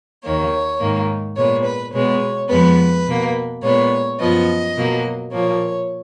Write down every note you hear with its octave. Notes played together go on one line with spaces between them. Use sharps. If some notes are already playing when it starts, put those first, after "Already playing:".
D#2 D#3 A#3 C#5
G#2 D#3 A#3
A#2 G#3 B3 C#5
B4
B2 G#3 B3 C#5
F2 F3 G#3 B3 B4
B2 A#3
A#2 G#3 B3 C#5
F#2 F3 B3 D#5
B2 F#3 A#3
A#2 F3 A#3 C#5